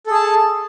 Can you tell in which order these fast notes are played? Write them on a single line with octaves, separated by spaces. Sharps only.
A4 G#4 A5